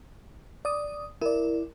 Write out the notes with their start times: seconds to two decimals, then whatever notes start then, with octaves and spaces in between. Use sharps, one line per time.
0.65 D5 D#6
1.21 E4 A#4 D5